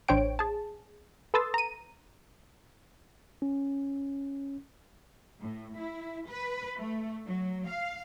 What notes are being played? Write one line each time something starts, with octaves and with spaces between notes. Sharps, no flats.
A1 D4 C5 C#5 G5 D7
G#4 A5
A4 B4 C6 D#6 E6 A6
A#5 D#7
C#4
A2
E4
B4
A3
F#3
F5